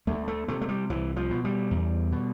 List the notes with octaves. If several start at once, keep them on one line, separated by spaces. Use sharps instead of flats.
D2 A3
A3
C3 A3
A3
G3
C2 E3
F3
B2
G3
E2
B2